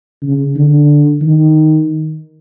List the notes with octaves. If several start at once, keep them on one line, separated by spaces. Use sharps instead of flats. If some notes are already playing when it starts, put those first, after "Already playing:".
C#3
D3
D#3